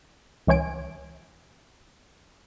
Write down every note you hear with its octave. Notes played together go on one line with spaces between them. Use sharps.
C#2 E3 C#5 G#5 D7